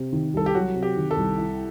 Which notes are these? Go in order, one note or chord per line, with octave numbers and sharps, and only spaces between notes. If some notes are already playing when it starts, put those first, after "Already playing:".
Already playing: C3
D#3
C2 A4
G4
F#3 F#4
C3
G4
D#3
A4
C2
E4